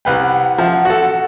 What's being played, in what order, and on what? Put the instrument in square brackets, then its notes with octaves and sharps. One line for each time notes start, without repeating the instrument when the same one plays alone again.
[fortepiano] C2 B4 G5
[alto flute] F#5
[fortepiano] F3 E5
F#4 A4